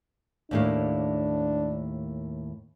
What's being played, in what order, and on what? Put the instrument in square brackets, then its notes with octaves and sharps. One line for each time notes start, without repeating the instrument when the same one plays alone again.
[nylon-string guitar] D#2 A2 A#3 [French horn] D4